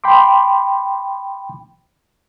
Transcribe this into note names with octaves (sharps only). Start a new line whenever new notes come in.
G5 B5 C6 D6